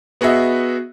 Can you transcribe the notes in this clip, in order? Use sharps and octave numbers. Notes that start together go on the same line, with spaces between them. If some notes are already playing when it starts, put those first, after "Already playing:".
B3 F#4 G#4 D#5 E5